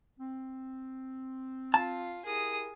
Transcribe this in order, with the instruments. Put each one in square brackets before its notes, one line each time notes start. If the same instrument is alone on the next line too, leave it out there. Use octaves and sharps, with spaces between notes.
[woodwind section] C4
[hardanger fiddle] F4 [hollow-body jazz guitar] A5
[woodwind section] E4 G4 A#4 [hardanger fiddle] G#4 D#6